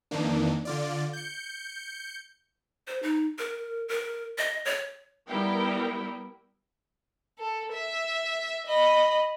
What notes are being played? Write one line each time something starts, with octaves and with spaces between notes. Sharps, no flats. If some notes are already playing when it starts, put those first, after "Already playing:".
F2 D#3 E3 A#3 D4
D3 F4 D5
G6 C#7
C5
D#4
A#4
A#4
D#5
C#5
G3 B3 E4 A#4 G5
A4
E5
D#5 B5